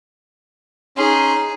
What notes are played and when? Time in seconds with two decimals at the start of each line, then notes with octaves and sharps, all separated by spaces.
0.97 C#4 D#4 G#4 C6